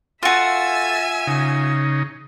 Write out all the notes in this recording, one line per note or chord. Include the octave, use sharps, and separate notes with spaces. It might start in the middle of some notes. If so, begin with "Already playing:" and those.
F4 F#4 A4 E5 G#5 E6
C#3 D#4